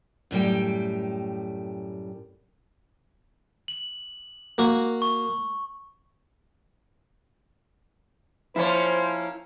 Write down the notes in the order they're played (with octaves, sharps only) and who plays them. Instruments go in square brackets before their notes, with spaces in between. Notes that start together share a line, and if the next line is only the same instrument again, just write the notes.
[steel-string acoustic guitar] F#2 A2 G3 G5
[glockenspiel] F#7
[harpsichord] A#3 F#4
[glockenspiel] C#6
[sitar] F3 A#3 C#4 [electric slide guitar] E4 [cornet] C5